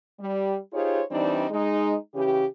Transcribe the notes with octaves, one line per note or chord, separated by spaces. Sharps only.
G3
D#4 F4 G4 G#4 C5 C#5
E3 G3 C4 D4 D#4
G#3 D#4
C#3 E3 C#4 G4